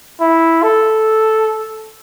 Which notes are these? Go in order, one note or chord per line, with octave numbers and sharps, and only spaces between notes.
E4
A4